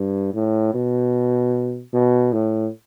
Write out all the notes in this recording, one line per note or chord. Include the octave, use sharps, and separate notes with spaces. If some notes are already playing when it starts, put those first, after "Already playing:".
Already playing: G2
A2
B2
B2
A2